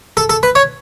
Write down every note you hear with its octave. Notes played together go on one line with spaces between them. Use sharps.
A4
A4
B4
C#5